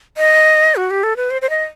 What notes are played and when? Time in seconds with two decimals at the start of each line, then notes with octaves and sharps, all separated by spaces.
0.17 D#5
0.76 F#4
0.90 G4
1.03 A4
1.16 B4
1.30 C5
1.42 C5
1.50 D#5